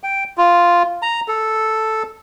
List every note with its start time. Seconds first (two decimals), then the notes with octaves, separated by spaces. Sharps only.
0.03 G5
0.37 F4
1.02 A#5
1.28 A4